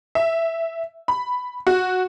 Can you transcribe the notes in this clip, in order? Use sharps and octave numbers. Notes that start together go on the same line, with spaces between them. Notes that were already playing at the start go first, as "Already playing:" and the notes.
E5
B5
F#4